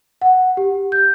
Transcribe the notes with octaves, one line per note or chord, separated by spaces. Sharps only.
F#5
G4
G6